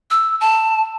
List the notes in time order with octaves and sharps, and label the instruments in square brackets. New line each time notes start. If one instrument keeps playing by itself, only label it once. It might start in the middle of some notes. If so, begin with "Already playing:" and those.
[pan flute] E6
A5